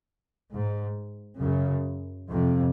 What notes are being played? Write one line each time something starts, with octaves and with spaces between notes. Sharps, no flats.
G#2
F#2 C#3
F2 C3